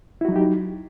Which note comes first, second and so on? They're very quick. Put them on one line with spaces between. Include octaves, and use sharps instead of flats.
E4 F#4 F#3 D#4 G4